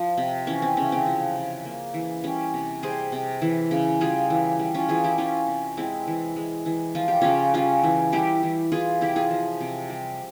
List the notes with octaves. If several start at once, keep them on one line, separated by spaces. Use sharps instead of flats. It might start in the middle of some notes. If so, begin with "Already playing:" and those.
Already playing: F3
C3
E3 C#4
C4
C#3 C#4
C4
F3
C3
A#3
E3
G3 C#4
C3
G3 G#4 C5
C3
E3
C#3
G3 F4 G#4
E3
G3
C#4 F4
E3 F4 G#4
E4 G4
E3 C#4 F4
C3
G#3 C4 E4
E3
G#3
E3
F3 F4
G4
C#3 C#4 F4
G3 C#4 F4
E3
G3 E4 G4
E3
E3 F4 G#4
C3 E4 G4
F4 G#4
F3
C3
G3